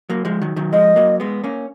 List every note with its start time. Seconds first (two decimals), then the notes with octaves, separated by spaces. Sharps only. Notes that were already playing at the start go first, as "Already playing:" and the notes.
0.10 F#3 A#3
0.25 F3 G#3
0.42 D#3 F#3
0.56 D#3 F#3
0.72 F3 G#3 D#5
0.96 F#3 A#3
1.20 G#3 B3
1.44 A#3 C#4